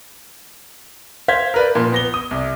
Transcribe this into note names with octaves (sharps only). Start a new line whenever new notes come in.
C5 F5 G6 G#6 B6
A#4 B4 D5
A#2 F3
B3 A#6 G7
D#6
C2